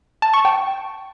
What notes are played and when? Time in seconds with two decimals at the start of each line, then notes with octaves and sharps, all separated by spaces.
0.22 A5
0.34 C#6
0.45 G5